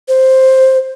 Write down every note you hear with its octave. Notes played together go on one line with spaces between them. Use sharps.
C5